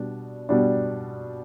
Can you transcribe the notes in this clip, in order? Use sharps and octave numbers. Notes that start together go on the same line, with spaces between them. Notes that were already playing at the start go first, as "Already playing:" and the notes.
Already playing: B2 G3 D4
B2 G3 D4